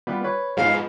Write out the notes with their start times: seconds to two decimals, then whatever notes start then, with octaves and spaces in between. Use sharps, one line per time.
0.07 G3 B3 F4 B4
0.24 B4 C#5
0.57 G#2 F3 B3 D#5 F5